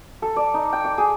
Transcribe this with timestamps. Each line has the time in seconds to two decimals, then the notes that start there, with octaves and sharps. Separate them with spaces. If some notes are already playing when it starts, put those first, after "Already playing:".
0.22 A4
0.36 D5
0.54 D#4
0.73 G5
0.85 D6
0.98 G#4